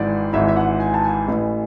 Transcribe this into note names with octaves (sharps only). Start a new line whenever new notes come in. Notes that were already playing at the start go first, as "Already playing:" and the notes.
Already playing: G#1 G#2 E3 D5
G#1 G#2 E3 E5
E5
F#5
G#5
A5
G#5
A1 A2 E3